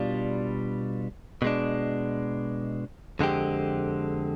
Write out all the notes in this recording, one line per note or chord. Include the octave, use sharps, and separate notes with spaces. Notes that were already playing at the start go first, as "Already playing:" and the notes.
Already playing: B2 G3 D4 F4
B2 G#3 D4
F2 D3 G#3 C4 G4